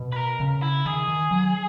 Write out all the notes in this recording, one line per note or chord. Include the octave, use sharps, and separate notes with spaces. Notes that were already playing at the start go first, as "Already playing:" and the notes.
Already playing: B2
B4
A#4
C#3
E4
D#3 G#4
D#3
F#3